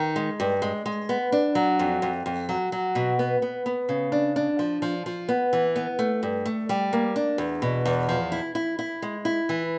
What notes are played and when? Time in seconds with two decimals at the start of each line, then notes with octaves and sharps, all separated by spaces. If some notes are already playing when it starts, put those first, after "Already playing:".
Already playing: D#3
0.16 G#3
0.40 G2
0.62 G#3
0.86 G#3
1.09 B3
1.32 D4
1.55 F#3
1.79 F2
2.02 F2
2.26 F2
2.49 F#3
2.72 F#3
2.95 B2
3.19 B3
3.42 B3
3.66 B3
3.89 C#3
4.12 D4
4.36 D4
4.59 F3
4.82 F3
5.06 F3
5.29 B3
5.53 E3
5.76 B3
5.99 A3
6.23 G2
6.46 A3
6.69 G3
6.93 A#3
7.16 D4
7.38 E2
7.62 B2
7.85 E2
8.09 F3
8.32 E4
8.55 E4
8.79 E4
9.02 G#3
9.25 E4
9.49 E3